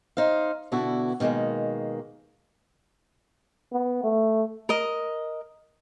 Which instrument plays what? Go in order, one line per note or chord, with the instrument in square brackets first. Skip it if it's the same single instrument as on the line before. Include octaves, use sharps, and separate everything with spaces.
[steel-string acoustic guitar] D#4 C5 F5
B2 D3 B3 D4 E4 F#4
B2 D#3 F3 G#3 A#3
[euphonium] B3
A3
[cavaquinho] A#4 D#5